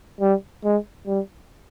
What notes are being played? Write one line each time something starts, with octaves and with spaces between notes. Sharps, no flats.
G3
G#3
G3